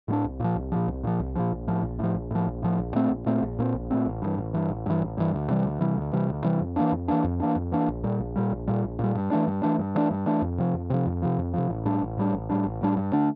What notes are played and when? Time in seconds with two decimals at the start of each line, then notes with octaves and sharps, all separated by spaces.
0.08 A2 G3 D4
0.24 C2
0.40 A#2 F3
0.56 C2
0.72 A#2 F3
0.87 C2
1.03 A#2 F3
1.20 C2
1.35 A#2 F3
1.52 A#1
1.67 A2 F3
1.83 A#1
1.99 A2 F3
2.15 A#1
2.31 A2 F3
2.47 A#1
2.62 A2 F3
2.79 A#1
2.95 A#2 A3 C4
3.10 A#1
3.26 A#2 A3 C4
3.42 A#1
3.59 A#2 A3 C4
3.74 A#1
3.90 A#2 A3 C4
4.06 A1
4.22 G2 E3
4.37 A1
4.54 G2 E3
4.70 A1
4.86 G2 E3
5.01 A1
5.17 G2 E3
5.34 D2
5.49 C3 E3 G3
5.65 D2
5.81 C3 E3 G3
5.97 D2
6.13 C3 E3 G3
6.29 D2
6.44 C3 E3 G3
6.61 F2
6.76 E3 A#3 D4
6.92 F2
7.08 E3 A#3 D4
7.24 F2
7.40 E3 A#3 D4
7.56 F2
7.72 E3 A#3 D4
7.88 A#1
8.03 A#2 G3
8.20 A#1
8.36 A#2 G3
8.52 A#1
8.67 A#2 G3
8.84 A#1
8.99 A#2 G3
9.15 G2
9.31 E3 A3 D4
9.47 G2
9.63 E3 A3 D4
9.79 G2
9.95 E3 A3 D4
10.11 G2
10.26 E3 A3 D4
10.42 F2
10.58 C3 F3
10.74 F2
10.90 C3 F3
11.06 F2
11.22 C3 F3
11.38 F2
11.54 C3 F3
11.70 A1
11.85 A2 G3 D4
12.01 A1
12.18 A2 G3 D4
12.33 A1
12.50 A2 G3 D4
12.65 A1
12.81 A2 G3 D4
12.97 G2
13.13 D3 A3 D4